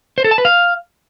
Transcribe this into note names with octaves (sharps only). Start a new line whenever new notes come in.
C5
A4
A5
B4
F5